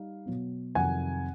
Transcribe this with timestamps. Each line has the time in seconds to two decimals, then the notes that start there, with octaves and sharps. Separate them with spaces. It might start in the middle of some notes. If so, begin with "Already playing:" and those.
Already playing: G3 D#4 F5
0.26 B2 F#3 B3
0.75 F2 C3 D#3 F#3 F#5 G#5